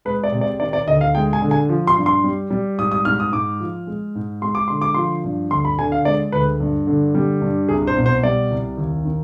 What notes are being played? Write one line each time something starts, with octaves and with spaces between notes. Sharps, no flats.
G#3 B4
D5
C3
D5
D#3 D5
D5
D2 D#5
F5
G#3 G5
G#5
D3
G#5
F3
C6
G2
C6
G3
G3
G#2 D#6
D#6
G#2 F6
D#6
G#2 D6
F3
G#3
G#2
G#3 C6
D6
D3 C6
D6
F3 C6
G2
D2 C6
B5
D3 G#5
F5
G#3 D5
D2 B4
G2
D3
G3
G2
C2 G#4
C5
B2
C5
G3 D5
C2
D#2
D#3